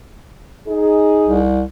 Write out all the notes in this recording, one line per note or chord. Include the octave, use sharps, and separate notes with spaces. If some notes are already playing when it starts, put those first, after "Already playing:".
D#4 G#4
C2